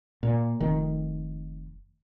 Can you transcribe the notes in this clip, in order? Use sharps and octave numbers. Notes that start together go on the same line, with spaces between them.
A#2
F1 D#3